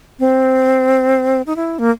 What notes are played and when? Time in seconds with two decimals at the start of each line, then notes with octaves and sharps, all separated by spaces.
0.19 C4
1.47 D#4
1.56 E4
1.79 A#3